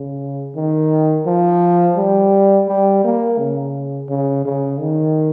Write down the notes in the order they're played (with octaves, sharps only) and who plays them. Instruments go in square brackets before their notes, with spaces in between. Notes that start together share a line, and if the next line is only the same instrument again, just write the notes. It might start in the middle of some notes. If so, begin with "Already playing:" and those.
Already playing: [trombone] C#3
D#3
F3
G3
G3
A#3
C#3
C#3
C#3
D#3